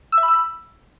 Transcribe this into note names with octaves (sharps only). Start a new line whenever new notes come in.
E6
E5
B5
E6
B5